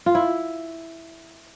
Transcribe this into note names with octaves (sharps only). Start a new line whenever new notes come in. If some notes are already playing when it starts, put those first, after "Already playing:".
F4
E4